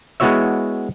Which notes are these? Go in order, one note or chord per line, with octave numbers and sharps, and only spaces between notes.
G#3 B3 E4 F#4 C#5 E5